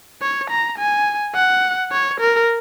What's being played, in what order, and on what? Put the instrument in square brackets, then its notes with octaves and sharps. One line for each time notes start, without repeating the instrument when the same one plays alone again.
[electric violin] C#5
A#5
G#5
F#5
C#5
A#4